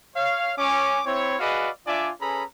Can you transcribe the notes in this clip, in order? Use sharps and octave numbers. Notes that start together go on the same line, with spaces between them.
C#5 F5
C#4 D6
C4 E4 C#5
F#4 G#4 B4 D5 D#5 F5
D4 F4 D5 E5 G#5 D6
C#4 G#4 A4 B4 A#5 B5